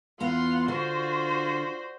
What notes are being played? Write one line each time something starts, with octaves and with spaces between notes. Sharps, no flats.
E2 B3 F4 F5 F#5 A#5 C6
D3 F#4 C5